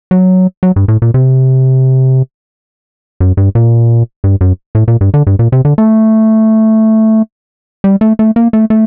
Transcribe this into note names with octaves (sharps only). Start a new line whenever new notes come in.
F#3
F#3
G2
A2
A#2
C3
F#2
G2
A#2
G2
F#2
A2
A#2
G2
D3
G2
A#2
C3
D3
A3
G3
A3
A3
A#3
A3
A3